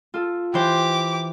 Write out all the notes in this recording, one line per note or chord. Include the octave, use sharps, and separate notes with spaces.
F4 A4
E3 G4 C5 D6